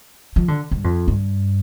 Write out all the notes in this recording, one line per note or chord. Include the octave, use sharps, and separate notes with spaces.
F3
D3
G2
F2
G2